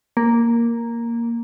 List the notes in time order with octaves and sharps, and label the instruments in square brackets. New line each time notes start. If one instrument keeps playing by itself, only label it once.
[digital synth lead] A#3